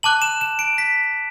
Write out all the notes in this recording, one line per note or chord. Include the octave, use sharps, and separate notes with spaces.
A5 D6 F#6 F#7
E7
E7
D7
B6